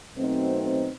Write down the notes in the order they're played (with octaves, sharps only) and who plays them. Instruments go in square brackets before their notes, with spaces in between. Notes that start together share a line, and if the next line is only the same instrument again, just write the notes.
[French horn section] B2 F#3 A3 C4 D#4